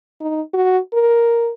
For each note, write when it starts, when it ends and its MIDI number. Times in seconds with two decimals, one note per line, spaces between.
0.21 0.41 63
0.53 0.78 66
0.93 1.51 70